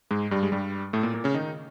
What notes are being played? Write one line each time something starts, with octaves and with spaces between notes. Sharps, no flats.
G#2 G#3
G2 G3
G#3
G2 G3
A2 A3
A#2 A#3
A#2 A#3
C#3 C#4
D#3 D#4